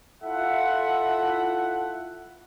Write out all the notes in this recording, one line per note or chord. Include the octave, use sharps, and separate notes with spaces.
E4 F4 A4 E5 F#5